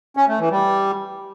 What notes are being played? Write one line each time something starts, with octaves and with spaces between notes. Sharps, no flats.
C#4
A3
E3
G3